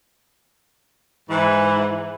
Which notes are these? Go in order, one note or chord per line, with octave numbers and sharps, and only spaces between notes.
G#2 E3